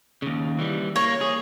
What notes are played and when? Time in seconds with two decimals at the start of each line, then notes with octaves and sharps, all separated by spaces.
0.22 D#2 C#3
0.59 E3 G3
0.96 A#3 C#5
1.21 G#4